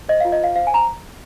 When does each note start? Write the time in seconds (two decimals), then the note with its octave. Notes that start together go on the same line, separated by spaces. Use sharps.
0.08 C5 D#5
0.20 F5
0.25 F4
0.32 D#5
0.41 C5 F5
0.55 C5 F5
0.67 G#5
0.71 C5 A#5